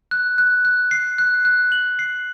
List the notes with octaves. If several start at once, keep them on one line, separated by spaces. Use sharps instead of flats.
F#6
F#6
F#6
C7
F#6
F#6
F#7
C7